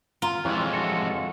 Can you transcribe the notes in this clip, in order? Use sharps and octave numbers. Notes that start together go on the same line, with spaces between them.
F4 A#5
F2 E3 G#3 G4 C#5
F#4 A4